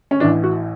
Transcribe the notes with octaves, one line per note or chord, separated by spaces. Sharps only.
C#4
A1 A2 E3 D4
F#4